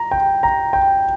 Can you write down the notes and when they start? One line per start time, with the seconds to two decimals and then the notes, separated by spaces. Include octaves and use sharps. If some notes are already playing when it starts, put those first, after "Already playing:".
Already playing: A#5
0.11 G5
0.43 A#5
0.73 G5